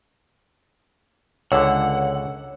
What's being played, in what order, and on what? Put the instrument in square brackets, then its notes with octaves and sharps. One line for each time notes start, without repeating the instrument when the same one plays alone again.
[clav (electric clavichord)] C#2 D3 [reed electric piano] C#5 E6 [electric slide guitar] F#5